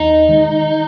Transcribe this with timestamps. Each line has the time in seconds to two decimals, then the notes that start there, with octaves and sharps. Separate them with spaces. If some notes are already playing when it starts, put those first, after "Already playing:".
Already playing: D#2 D#4
0.29 D#3 G#3